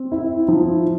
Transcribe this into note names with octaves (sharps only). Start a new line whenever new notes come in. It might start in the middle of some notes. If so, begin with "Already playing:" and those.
Already playing: C4
E4
F3